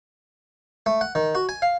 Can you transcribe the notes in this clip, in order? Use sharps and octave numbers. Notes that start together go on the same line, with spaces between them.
A3
F#5
D#3
F#4
G#5
F5